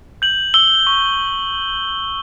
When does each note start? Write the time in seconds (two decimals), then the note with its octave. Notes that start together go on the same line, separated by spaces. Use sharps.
0.22 G6 F#7
0.54 E6 G7
0.87 C#6